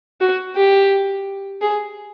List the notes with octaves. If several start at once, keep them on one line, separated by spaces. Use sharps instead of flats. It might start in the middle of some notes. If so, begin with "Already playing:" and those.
F#4
G4
G#4